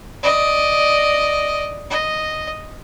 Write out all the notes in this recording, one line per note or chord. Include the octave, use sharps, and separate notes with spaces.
D5 D#5
D#5